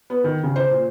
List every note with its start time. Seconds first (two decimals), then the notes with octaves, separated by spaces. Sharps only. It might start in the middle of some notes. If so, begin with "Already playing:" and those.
0.10 B3
0.24 D#3
0.43 C#3
0.56 C5
0.71 A#2